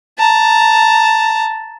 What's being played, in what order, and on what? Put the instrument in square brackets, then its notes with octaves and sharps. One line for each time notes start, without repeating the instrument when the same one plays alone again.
[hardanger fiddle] A5 A#5